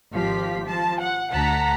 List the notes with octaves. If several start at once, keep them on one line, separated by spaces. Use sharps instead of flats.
G#1 F3 G4 F5 B6
F3 A5
F#5
D2 F#5 A5 A#5 B6